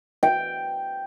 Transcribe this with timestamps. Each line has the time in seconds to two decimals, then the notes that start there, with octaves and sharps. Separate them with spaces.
0.23 G5